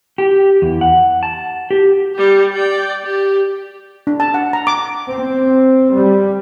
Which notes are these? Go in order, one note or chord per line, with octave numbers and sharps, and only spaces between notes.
G4
E2
F#5
A5
G4
G3 G4
D5 G5
G4
D4
A5
F#5
A#5
D6
C4
G3